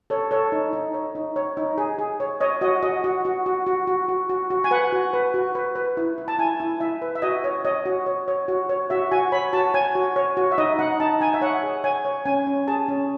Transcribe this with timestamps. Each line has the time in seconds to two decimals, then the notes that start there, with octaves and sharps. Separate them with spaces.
0.10 A4 C#5
0.31 A4 C#5
0.52 D#4
0.73 D#4
0.94 C#5
1.15 D#4
1.36 C#5
1.57 D#4
1.78 G#4
1.98 G#4
2.20 C#5
2.40 C#5 D#5
2.61 F#4 D#5
2.83 F#4 D#5
3.04 F#4
3.25 F#4
3.46 F#4
3.67 F#4
3.87 F#4
4.08 F#4
4.29 F#4
4.50 F#4
4.64 G#5
4.71 B4 F#5
4.92 F#4
5.13 B4
5.34 F#4
5.55 B4
5.76 B4
5.97 E4
6.18 E4
6.28 A5
6.39 E4 G#5
6.60 E4
6.80 E4 E5
7.02 B4
7.15 E5
7.22 F#4 D#5
7.44 C#5
7.65 C#5 D#5
7.85 F#4
8.06 C#5
8.28 C#5
8.48 F#4
8.69 C#5
8.90 F#4 E5
9.11 F#4 G#5
9.32 C#5 B5
9.53 F#4 A5
9.74 C#5 G#5
9.95 F#4
10.16 C#5
10.37 F#4
10.52 E5
10.58 D#4 D#5
10.79 D#4 F#5
11.00 D#4 A5
11.21 D#4 G#5
11.34 E5
11.42 C#5 F#5
11.63 G#4
11.84 C#5 G#5
12.05 C#5
12.26 C#4 G#5
12.47 C#4
12.67 G#4 A5
12.89 C#4